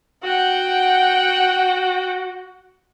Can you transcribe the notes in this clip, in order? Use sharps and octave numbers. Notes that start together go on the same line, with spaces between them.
F#4 F#5 G5